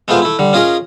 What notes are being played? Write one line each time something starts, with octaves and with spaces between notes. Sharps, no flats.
G#3 A3 B3 F4 C5
A3 E4
D3 G3
C#4 F4 G#4 A#4 D#5